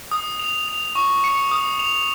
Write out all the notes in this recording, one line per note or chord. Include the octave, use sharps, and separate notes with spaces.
D#6
F7
F7
C#6
C#7
D#6
F7